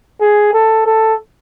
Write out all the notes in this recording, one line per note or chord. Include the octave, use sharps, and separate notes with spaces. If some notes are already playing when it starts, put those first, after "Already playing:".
G#4
A4
A4